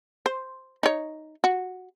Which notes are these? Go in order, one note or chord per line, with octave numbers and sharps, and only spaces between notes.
C5
D#4 C#5
F#4